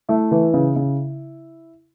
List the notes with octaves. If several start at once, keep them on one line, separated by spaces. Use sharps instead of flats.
A3 E4
E3
C#3
C#3